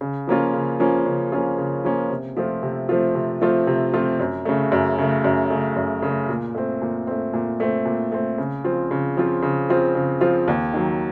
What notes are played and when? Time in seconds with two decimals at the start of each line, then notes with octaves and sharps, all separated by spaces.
0.01 C#3
0.27 F3 A#3 C#4 F4
0.54 C#3
0.79 F3 A#3 C#4 F4
1.06 C#3
1.32 F3 A#3 C#4 F4
1.58 C#3
1.84 F3 A#3 C#4 F4
2.10 C3
2.36 F3 A3 C4 F4
2.63 C3
2.89 F3 A3 C4 F4
3.15 C3
3.41 F3 A3 C4 F4
3.67 C3
3.94 F3 A3 C4 F4
4.19 F#2
4.45 C#3 A3
4.72 F#2
4.99 C#3 A3
5.24 F#2
5.50 C#3 A3
5.76 F#2
6.02 C#3 A3
6.29 A#2
6.55 A3 C4
6.82 A#2
7.07 A3 C4
7.34 A#2
7.60 A3 C4
7.85 A#2
8.12 A3 C4
8.38 C#3
8.64 F3 C4 F4
8.91 C#3
9.17 F3 C4 F4
9.42 C#3
9.69 F3 C4 F4
9.95 C#3
10.21 F3 C4 F4
10.48 D#2
10.73 D#3 F#3